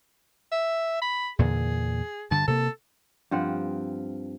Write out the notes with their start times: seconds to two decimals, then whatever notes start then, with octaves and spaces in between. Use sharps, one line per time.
0.52 E5
1.02 B5
1.39 E2 A#2 D3 G#4
2.31 G2 D3 A5
2.48 C3 A#3 A4
3.31 G2 F3 C4 F#5